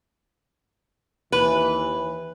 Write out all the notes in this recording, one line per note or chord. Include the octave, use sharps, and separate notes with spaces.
D#2 E3 B4